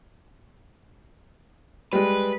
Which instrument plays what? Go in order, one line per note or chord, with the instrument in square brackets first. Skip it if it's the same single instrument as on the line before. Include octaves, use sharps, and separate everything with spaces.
[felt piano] G3 G#3 [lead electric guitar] B4